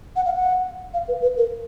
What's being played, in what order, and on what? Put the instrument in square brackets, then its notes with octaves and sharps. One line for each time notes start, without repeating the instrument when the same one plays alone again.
[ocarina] F#5
F5
F#5
F5
B4
B4
A#4